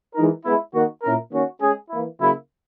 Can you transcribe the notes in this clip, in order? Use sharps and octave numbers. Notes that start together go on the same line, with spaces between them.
E3 G#3 D#4 A#4
G#3 B3 E4
D#3 A#3 D#4 F#4
A#2 A#3 C#4 E4 A#4
D#3 A#3 C#4 F#4
G#3 C#4 G#4
E3 A#3 E4
C#3 F#3 A#3 E4